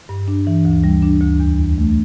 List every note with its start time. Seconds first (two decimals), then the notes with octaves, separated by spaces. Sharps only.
0.09 G2
0.28 D4
0.47 E3
0.65 D2
0.84 G3
1.02 D4
1.21 D2
1.40 E2
1.59 E2
1.78 A3